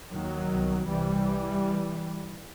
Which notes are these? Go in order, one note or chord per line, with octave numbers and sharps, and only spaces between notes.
D#2 D#3 F#3
C2 B2
C2 C3 E3 G3